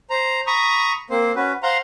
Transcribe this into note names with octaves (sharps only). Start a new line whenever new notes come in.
C5 A#5
A#5 B5 C#6 D#6
A#3 C4 C5
C#4 F#4 B4
C5 F5 F#5 A#5 C6